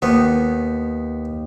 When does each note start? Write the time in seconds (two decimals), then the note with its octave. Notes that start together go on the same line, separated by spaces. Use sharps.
0.02 D#2 D#3 B3